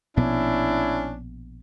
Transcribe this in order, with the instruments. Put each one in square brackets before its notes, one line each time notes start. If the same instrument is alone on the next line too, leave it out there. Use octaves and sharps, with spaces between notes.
[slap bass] A#1 B2 B3 [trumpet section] C#4 E4 [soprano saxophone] D4